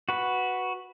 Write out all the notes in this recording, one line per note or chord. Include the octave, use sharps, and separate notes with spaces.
F#4 B4